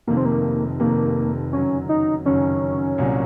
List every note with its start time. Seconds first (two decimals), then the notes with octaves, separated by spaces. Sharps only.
0.07 F1 F2 C3 D#3 A#3
0.17 C4
0.25 A#3
0.80 F1 F2 C3 D#3 A#3
1.53 F#1 F#2 D#3 F#3 C#4
1.89 D#4
2.26 F#1 F#2 D#3 F#3 C#4
2.98 C2 A#2 F#3